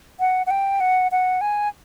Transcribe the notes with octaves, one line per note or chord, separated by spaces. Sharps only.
F#5
F#5
G5
F#5
F#5
G#5